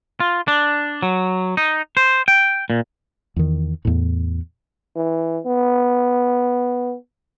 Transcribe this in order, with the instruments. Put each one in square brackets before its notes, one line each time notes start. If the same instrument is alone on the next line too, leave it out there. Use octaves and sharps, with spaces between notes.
[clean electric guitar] F4
D4
F#3
D#4
C5
G5
A#2
[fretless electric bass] E2 D#3
E2 A2
[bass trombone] E3
B3